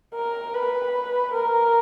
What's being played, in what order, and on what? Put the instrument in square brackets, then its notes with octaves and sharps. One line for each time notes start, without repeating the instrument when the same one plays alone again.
[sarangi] A#4
B4
A#4